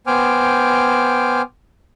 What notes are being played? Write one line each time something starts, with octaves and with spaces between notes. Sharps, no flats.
B3 C5 G5 G#5 D6 F6